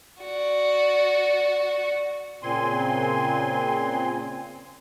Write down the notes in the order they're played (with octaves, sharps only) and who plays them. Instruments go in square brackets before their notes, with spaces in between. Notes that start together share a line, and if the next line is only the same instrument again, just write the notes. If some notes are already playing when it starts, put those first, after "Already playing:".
[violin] F#4 D5
[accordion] A#2 C#3 C4 G#5 C6